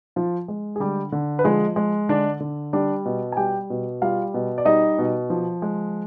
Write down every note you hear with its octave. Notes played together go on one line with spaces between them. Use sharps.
F3 F4
G#3
G#4
D3 G3 G4
D3
B4
F3 G#3 G#4
G#3
D3 D4 D5
D3
G3 D4 D5
B2
G#5
G3 G4 G5
B2
G3 F4 F5
B2
D5
G3 D#4 D#5
B2
F3
G#3